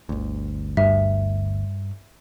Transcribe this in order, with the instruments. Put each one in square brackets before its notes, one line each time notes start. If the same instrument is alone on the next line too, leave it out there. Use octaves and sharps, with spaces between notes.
[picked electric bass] G1 D2
[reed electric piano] G2 [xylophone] E5